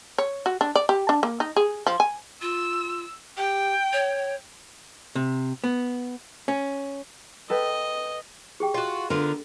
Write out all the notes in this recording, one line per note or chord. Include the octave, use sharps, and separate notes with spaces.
C#5
F#4
D4
D5
G4
D4
A#3
D#4
G#4
F3
G#5
F4 E6
G4 G5
C#5
C3
B3
C#4
A4 B4 D#5 G5
G4 G#4 G5
F4 F#4 D#5
D3 B3 F4 A#4